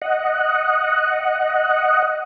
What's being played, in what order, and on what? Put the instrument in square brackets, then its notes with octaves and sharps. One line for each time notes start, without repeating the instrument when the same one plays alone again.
[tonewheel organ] D#5 F#5